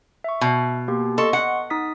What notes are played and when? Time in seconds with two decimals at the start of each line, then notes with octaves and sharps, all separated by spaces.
0.24 E5 C#6
0.41 B2
0.88 A#3 G4
1.18 A4 D#5 C6 C#6
1.33 F#5
1.70 D#4 D#6 B6